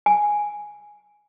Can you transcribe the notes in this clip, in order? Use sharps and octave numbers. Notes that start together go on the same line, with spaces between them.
G#5